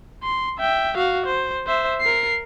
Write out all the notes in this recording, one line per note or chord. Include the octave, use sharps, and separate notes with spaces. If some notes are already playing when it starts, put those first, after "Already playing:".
C6
E5 G5
F#4 F5
C5
C5 E5
A#4 C7